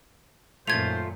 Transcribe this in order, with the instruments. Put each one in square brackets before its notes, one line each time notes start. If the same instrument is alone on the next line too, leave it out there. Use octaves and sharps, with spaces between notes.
[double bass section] F#2 A#2 D#3 [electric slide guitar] A3 F4 [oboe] C5 [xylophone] G#6 F7